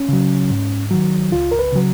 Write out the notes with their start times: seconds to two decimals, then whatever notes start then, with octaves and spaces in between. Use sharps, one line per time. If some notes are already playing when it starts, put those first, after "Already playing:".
Already playing: C#4
0.09 C#3 F#3
0.50 G#2
0.90 D#3 F#3
1.32 C#2 F4
1.52 A#4
1.59 B4
1.72 C#3 F#3